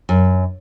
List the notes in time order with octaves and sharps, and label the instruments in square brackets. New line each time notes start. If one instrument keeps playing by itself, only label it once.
[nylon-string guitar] F#2